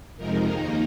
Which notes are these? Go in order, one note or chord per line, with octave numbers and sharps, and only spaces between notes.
F2 C3 F3 G#3 D#4 A#4
D#2 D#3 A#3 D#4